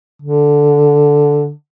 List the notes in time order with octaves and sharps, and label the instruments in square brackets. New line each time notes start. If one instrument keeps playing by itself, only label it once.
[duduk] D3